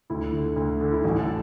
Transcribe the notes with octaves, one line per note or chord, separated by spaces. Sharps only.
D2 E4
D3
D2
D3
E4
A1 F#4
A4